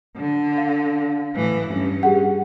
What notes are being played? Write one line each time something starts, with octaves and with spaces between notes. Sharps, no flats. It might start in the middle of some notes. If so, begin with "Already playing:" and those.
D3
F5
A2 E3
G2 C#4
G4 G#4 F#5